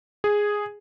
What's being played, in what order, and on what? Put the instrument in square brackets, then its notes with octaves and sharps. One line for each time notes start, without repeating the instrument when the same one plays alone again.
[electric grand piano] G#4